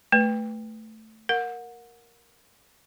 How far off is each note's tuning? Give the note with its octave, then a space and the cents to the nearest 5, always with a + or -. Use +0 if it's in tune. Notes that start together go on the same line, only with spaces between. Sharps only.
A3 +0 B4 +0
A#4 +0 F#5 -30